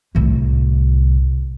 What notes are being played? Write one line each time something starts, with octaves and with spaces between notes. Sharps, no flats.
C2 A2